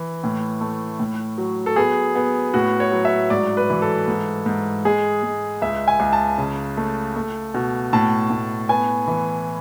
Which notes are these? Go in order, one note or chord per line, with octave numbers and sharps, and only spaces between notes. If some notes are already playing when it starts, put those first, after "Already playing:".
Already playing: E3
A2
A3
A2
F#3
A4
B3 G#4
B3
A2 F#4
C#5
F#3
E5
G#2 D5
B4
E3
A4
G#2
G#2
G#3 G#4
G#3
C#2 E5
G#5
C#2
A5
C#3
A3
A3
B2
A2 A5
A2
B3 G#5
E3